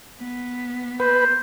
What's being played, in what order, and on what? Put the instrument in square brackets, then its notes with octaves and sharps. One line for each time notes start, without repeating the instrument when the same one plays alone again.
[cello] B3
[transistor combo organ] B4 [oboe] C5